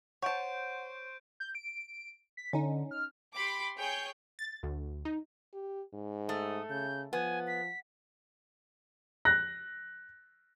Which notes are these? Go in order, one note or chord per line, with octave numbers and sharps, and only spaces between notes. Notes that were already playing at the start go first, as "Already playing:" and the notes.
C5 C#5 F#5 A5 C#6 G6 D7
G6
D7
B6
D3 C#4 D#4
F6
G4 B5 C6 D6
G#4 C#5 G5 G6
A6
D2
D#4
G4
G#2
A3 D#6
C#3 G6
F3 B3 G#5
B6
F#6 A#6